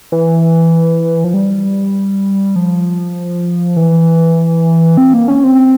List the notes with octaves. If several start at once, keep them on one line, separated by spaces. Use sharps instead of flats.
E3
F3
G3
F3
E3
C4
A#3
C#4
C4